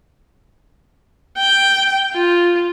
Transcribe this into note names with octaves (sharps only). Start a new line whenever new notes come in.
G5
F4